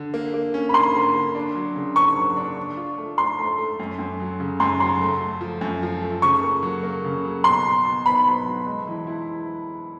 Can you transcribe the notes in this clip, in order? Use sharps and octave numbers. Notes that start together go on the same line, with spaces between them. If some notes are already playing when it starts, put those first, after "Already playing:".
Already playing: D3
A#3
A#3
C#4
B5
A#3 C6
D3
D3
D4
F#3
C#3
A#3 C#6
F#3
D4
D4
F4
A3
A3 C6
A3
A3
F#2
F#2
F#3
C#3
F#2 C6
F#3 C6
A3
A3
F3
F#2
F3
A3
C#3 C#6
A#3
F#3
A#3
C#3
F#3
B2 C6
B2
B2
B3 B5
F#3
F#3
G#3
E3
E4